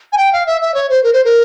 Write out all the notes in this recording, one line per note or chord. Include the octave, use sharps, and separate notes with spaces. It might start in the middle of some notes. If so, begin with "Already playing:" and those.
G#5
G5
F5
E5
E5
C#5
C5
A#4
C5
A#4